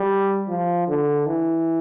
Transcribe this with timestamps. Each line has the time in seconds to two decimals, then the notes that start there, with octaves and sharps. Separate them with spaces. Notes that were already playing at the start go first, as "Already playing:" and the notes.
Already playing: G3
0.49 F3
0.88 D3
1.27 E3